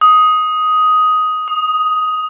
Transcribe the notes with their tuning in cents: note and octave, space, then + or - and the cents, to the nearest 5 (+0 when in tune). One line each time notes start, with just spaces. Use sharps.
D#6 +10
D#6 -15